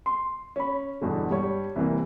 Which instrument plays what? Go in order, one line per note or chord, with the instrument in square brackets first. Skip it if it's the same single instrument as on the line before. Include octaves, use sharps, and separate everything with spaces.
[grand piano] C6
C#4 B5
E2 G2 B2 D3
G2 G3 C#5
C2 C3 E3 A#3